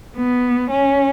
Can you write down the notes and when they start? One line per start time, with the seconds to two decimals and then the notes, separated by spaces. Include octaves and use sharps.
0.17 B3
0.71 C#4